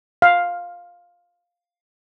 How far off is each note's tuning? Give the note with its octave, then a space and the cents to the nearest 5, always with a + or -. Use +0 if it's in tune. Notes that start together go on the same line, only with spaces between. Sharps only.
F5 +10